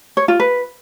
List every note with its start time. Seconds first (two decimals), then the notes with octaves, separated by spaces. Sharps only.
0.17 C#5
0.28 F4
0.40 B4